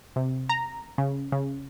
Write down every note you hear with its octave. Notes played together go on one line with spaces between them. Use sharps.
C3
A#5
C#3
C#3